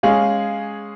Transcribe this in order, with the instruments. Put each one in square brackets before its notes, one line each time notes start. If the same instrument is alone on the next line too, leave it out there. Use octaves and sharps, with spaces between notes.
[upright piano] G#3 C#4 G#4 [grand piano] F5